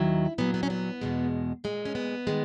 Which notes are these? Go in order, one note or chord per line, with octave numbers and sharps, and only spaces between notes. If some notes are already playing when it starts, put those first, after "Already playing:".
Already playing: D#2 D#3 F#3 E4
A#2 F#3 B3
B3
C#4
B3
E2 B2 G#3
A#2 G#3
C#4
B3
D#3 G#3